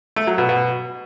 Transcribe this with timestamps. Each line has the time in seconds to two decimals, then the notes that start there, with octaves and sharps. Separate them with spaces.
0.16 A3
0.27 F#3
0.38 B2
0.49 B2